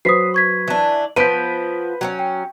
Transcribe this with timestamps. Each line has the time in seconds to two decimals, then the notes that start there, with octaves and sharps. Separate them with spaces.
0.05 F#3 B4 C5 D#6 B6 C7
0.34 C#6 G#6 B6
0.68 E3 D4
1.16 F3 B3 B4 G6 B6 D7 D#7
2.01 F#3 C4 C#4
2.19 G5